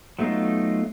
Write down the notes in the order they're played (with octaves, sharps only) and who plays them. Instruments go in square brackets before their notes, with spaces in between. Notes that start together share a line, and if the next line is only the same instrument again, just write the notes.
[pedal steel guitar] F#3 A3 B3 D#4 F4